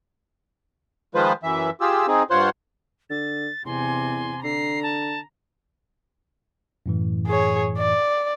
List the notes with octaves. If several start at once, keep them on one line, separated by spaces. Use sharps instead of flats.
D#3 F3 G#3 F4 B4 C5
F#2 E3 E5
F4 G4 G#4 E6
C4 D#4 G#4
G2 F4 C5 C#5 F#5 C6
D3 A6
E2 C3 G#5 C6
D3 A#5 C7
A5
F#2 A2 E3
G#4 C#5
D5